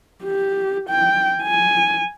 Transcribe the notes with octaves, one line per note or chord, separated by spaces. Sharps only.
G4
G5
G#5